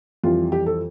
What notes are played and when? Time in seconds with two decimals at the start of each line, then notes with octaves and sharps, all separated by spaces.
0.24 F2 E3 G3 F4
0.52 G4
0.66 A4